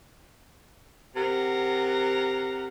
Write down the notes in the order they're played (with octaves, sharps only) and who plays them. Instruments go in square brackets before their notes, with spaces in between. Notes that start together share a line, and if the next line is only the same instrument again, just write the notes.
[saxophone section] C3 A#4 F#5